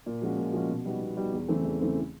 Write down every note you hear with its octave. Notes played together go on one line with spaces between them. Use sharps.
A#2
F3 G#3 C#4 F#4
A#2
F3 G#3 C#4 F#4
B2
G3 B3 D#4 F#4
B2
G3 B3 D#4 F#4
E2
C#3 E3 A3 C4
E2
C#3 E3 A3 C4